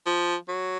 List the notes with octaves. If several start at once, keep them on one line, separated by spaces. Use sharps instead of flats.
F3
F#3